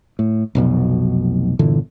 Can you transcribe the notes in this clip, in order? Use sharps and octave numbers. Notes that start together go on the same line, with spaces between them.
A2
F1 B1 B2
G1 A#2 D3 E3